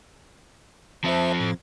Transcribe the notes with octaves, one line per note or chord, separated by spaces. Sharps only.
F3 C4 C5 E5 A5
A2